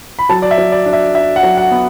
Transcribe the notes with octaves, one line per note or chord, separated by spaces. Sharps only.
B5
F#3 A5
D5
E5
F#3
D5
D4
E5
D4 E5
F#5
F#3
F#5
B3